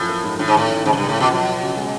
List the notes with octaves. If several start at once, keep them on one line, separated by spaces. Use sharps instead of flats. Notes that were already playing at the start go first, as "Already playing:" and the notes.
Already playing: F#2 A2 F3
A#3
G#2
A2 D#3
G#2
A1 A2
A1
G#2 C#3
F#2
C#2 G2
A2
B2 F3
B2 F#3
F#3
C#3
G#3